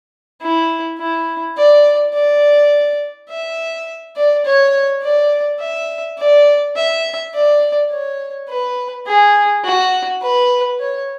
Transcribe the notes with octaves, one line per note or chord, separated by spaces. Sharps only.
E4
E4
D5
D5
E5
D5
C#5
D5
E5
D5
E5
D5
C#5
B4
G#4
F#4
B4
C#5